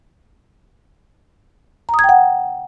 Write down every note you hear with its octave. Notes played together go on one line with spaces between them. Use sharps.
A#5
D#6
G#6
G5
F#5